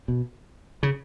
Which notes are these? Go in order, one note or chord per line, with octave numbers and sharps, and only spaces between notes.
B2
C#3